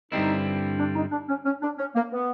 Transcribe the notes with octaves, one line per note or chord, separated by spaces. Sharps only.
G2 D3 G3 C4 D#4 E4
D4
D#4
D4
C#4
C#4
D4
C#4
A#3
B3